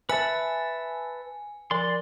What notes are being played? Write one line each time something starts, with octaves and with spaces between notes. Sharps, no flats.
B4 E5 G#5 A5
F3 D5 C6